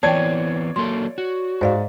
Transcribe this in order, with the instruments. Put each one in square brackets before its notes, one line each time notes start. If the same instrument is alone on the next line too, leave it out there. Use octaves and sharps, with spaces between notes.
[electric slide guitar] E3 B3 C4 [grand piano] C#5 D5 G#6 [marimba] G5 A5
[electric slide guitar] F#3 A#3 A4 [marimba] C6
[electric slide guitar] F#4
[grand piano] G#2 [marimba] C5 D5 F5